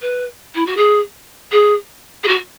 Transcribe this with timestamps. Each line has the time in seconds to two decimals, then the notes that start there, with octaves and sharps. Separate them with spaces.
0.01 B4
0.54 E4
0.66 F#4
0.77 G#4
1.52 G#4
2.23 G#4
2.27 F#4